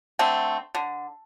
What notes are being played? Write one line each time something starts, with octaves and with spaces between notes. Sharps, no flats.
D3 A3 C4 G#5
D3